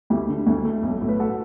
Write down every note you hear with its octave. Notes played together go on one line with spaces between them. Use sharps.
D2 E4 G4
D3
D2
A3
B1
A2
B4
F#4 A4